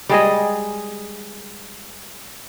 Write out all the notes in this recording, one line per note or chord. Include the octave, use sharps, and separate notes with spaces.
G3 G#3 G#4 D#5